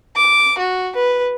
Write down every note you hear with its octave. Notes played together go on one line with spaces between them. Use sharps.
D6
F#4
B4